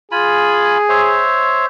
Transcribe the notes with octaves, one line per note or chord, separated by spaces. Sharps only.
F4 G#4 G#5 B5
C5 C#5 E5